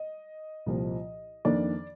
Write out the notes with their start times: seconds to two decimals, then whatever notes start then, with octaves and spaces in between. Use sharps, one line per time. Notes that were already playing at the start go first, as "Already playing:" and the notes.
Already playing: D#5
0.66 C2 A#2 F3
1.45 F2 D#3 A#3 D4 D5